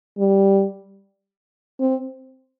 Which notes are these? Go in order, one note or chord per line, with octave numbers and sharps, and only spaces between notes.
G3
C4